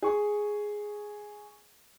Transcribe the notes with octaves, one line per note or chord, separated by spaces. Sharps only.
G#4 C#6